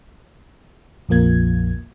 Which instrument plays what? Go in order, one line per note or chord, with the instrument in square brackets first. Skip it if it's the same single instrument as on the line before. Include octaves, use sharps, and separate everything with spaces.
[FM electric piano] A#1 F2 F3 A#3 G#6